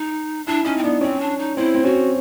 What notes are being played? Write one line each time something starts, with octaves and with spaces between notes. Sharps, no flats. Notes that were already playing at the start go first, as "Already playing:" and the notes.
Already playing: D#4
D4 E4
C#4 D#4
C4
B3 D4
C4 C#4
D4
D#4
C4 E4
C4
C#4 F#4